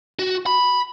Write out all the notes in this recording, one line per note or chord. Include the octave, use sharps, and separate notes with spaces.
F#4
B5